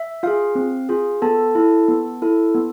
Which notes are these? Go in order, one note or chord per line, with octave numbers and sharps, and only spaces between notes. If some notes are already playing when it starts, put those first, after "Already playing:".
Already playing: E5
F4 G#4 F5
C4
F4 G#4
B3 A4 A5
E4 A4
B3
E4 A4
B3